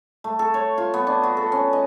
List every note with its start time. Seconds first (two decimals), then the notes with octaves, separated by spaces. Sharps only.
0.24 A3
0.39 A4
0.54 C#5
0.78 F4
0.94 B3
1.07 D4
1.23 F#4
1.37 A4
1.52 C#4
1.73 D#5